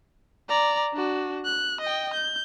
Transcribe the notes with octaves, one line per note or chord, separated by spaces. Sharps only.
D5 A#5
D4 F#4
F#6
D#5 G5
G6